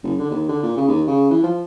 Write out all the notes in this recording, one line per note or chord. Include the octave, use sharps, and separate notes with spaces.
F#1
D3
D#2
D3
A#2
C#3
D#2
C#3
E3
F3